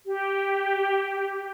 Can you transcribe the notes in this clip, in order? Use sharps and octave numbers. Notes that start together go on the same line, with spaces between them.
G4